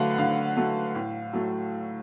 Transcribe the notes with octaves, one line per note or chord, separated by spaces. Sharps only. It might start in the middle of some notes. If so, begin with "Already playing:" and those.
Already playing: D3 F#3 A3 B4 F5 F#5
D3 F5
F#3 A3
A2
F#3 A3